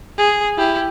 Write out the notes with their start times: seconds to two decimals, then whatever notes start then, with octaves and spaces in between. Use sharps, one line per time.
0.18 G#4
0.58 E4 G4